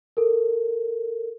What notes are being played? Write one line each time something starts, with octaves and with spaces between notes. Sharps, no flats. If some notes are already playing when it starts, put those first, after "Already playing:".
A4 A#4